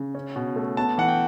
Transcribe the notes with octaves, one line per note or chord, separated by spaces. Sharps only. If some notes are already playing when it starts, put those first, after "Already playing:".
Already playing: C#3
C#4
B2
A3
B3 A5
E3 F#5
G5